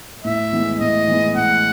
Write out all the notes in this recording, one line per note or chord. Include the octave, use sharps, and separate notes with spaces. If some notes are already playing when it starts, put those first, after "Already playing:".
A2 E5
E3 G#3 B3 E4
A2 D#5
E3 G#3 B3 E4
A2 F#5